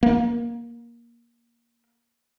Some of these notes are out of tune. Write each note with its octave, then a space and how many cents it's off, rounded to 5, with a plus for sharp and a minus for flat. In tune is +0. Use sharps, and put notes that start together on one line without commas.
A#3 +15